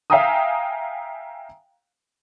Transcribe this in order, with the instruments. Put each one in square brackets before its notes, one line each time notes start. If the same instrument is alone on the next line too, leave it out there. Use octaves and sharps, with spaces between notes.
[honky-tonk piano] E5 F5 G5 G#5 A#5 D#6